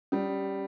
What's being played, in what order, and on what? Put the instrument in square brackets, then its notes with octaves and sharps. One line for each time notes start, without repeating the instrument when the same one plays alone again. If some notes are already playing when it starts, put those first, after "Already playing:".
[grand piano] G3 [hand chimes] C#4